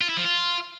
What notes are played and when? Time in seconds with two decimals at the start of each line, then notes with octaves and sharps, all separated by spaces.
0.01 F4
0.09 E4
0.17 F3
0.25 F4